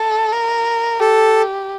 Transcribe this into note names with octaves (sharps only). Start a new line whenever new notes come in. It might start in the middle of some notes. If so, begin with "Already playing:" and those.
Already playing: A4
A#4
G4 A4